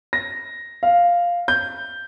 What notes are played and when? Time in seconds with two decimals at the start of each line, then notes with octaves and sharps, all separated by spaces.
0.13 A#6
0.83 F5
1.48 G6